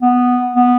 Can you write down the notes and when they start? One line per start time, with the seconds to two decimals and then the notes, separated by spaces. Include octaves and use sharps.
0.02 B3
0.56 B3